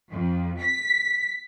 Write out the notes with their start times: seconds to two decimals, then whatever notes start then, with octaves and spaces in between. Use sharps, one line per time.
0.10 F2
0.59 B6